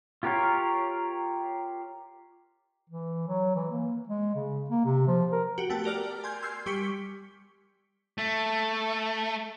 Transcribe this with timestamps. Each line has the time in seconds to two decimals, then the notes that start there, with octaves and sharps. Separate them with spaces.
0.23 F4 G4 A#4 C#5 F5
2.90 E3
3.28 F#3
3.56 E3
3.71 A#3
4.09 G#3
4.35 C#3
4.70 A#3
4.85 C3
5.08 F3
5.32 A#4
5.58 F#4 G4
5.70 A3 B3 G5 A5
5.84 G4 A#4 D5 F6
6.24 G#5 C6 G6 G#6
6.42 C6 E6 F6 G6 G#6 C7
6.66 G3 G4 C#6 D6 B6 C#7
8.18 A3